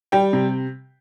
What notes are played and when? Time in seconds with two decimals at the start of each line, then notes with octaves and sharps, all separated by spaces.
0.12 G3 G5
0.33 C3